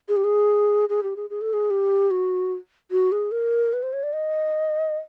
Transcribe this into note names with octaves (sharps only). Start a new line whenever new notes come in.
G#4
G4
G#4
G#4
G4
G#4
G#4
A4
G#4
G4
F#4
F#4
G#4
A#4
B4
C5
C#5
D5
D#5